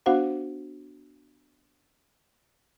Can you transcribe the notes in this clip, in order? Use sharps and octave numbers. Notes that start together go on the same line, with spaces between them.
B3 D4 F#4 C5 F5 F#5